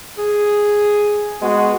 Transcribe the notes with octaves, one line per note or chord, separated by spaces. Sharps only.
G#4
G#3 B3 F#4